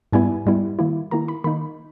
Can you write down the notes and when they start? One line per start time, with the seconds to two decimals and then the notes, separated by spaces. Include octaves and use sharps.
0.12 G#2 G3 B3 E4 G#5
0.46 G#2 G3 B3 E4
0.79 D#3 A#3 E4
1.11 D#3 A#3 E4 A#5
1.28 B5
1.44 D#3 A#3 D#4 B5